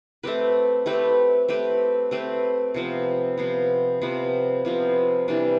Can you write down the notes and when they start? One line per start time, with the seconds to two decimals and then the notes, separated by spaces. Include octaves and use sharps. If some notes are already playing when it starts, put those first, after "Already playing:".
0.23 A3 C4 G4 B4
0.86 A3 C4 G4 B4
1.48 A3 C4 G4 B4
2.11 A3 C4 G4 B4
2.74 C3 F3 B3
3.38 C3 F3 B3
4.02 C3 F3 B3
4.65 C3 F3 B3
5.28 C3 E3 G3 D4